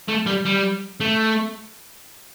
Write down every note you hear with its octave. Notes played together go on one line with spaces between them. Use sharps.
A3
G3
G3
A3